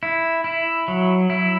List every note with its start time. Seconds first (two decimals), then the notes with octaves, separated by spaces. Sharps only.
0.03 E4
0.44 E4
0.88 F#3
1.30 E4